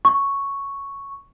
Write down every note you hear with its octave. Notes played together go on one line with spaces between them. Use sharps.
C#6